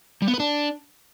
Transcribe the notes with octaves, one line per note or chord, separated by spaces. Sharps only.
G3
B3
B4
D4